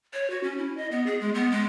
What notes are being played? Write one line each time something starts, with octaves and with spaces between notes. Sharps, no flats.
C#5
F#4
C#4
E4
D#5
B3
G#4
G#3
B3
G#3